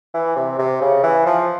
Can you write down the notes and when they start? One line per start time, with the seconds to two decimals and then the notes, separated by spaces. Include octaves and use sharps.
0.14 E3
0.36 C3
0.59 C3
0.81 C#3
1.03 E3
1.26 F3